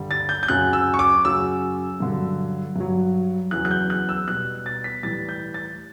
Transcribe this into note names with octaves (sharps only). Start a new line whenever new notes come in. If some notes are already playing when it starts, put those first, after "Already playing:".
Already playing: G2 D3 G3
A6
G6
G6
F#2 C#3 F#3 F#6
E6
C#6
D6
F#2 C#3 F#3 E6
G2 D3 F#3
G2 F#3
E2 C#3 F#3 F#6
F#6
G6
F#6
E6
B2 G3 F#6
A6
B6
A2 E3 G3 A6
G6
A6